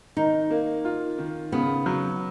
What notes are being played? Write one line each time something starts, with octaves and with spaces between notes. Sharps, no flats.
D#3 D#4
A#3
F4
D#3
C#3 B3
F#3